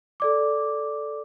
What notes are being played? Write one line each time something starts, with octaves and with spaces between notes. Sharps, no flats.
A4 D5 D6